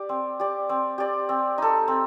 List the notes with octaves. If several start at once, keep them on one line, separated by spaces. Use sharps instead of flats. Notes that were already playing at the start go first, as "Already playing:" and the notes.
Already playing: G4 D5
C4
G4 D5
C4
G4 D5
C4
D#4 A4
C4